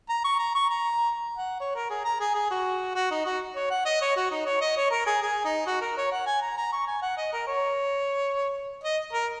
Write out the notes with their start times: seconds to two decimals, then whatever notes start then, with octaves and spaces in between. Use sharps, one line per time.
0.09 A#5
0.24 C#6
0.39 A#5
0.55 C#6
0.70 A#5
1.37 F#5
1.60 C#5
1.75 A#4
1.90 G#4
2.05 A#5
2.20 G#4
2.34 G#4
2.50 F#4
2.95 F#4
3.11 D#4
3.26 F#4
3.55 C#5
3.70 F#5
3.85 D#5
4.01 C#5
4.16 F#4
4.31 D#4
4.46 C#5
4.61 D#5
4.77 C#5
4.91 A#4
5.06 G#4
5.22 G#4
5.44 D#4
5.67 F#4
5.81 A#4
5.97 C#5
6.11 F#5
6.26 G#5
6.42 A#5
6.57 A#5
6.72 C#6
6.86 G#5
7.02 F#5
7.17 D#5
7.33 A#4
7.47 C#5
8.83 D#5
9.13 A#4